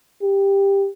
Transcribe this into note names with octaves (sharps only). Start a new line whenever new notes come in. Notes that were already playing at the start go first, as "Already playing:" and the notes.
G4